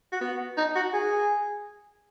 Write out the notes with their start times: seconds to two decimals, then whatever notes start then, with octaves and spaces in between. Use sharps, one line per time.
0.12 F#4
0.21 B3
0.57 D#4
0.75 F#4
0.93 G#4